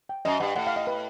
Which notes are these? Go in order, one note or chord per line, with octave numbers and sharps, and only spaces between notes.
G5
F#2 D#5
G2 F#5
A2 F#5
F5
D#5
B4